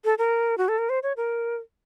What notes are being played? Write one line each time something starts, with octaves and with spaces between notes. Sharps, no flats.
A4
A#4
F#4
A4
A#4
C5
C#5
A#4